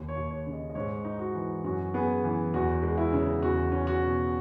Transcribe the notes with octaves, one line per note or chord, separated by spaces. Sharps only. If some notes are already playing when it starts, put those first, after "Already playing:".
Already playing: D#2
C#5
D#2
C#5
C#3
D#5
D#5
G#2 C#5
D#4
F#4
E3
F#2 F#4
B3 G#4
E3
E2 F#4
G#3
E4
C#3
E2 F#4
C#4
F#4
B2